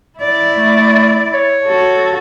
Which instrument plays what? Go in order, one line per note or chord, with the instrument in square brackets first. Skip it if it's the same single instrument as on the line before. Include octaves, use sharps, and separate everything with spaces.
[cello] E4 D5
[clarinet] A3
C#5
[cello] F#4 A4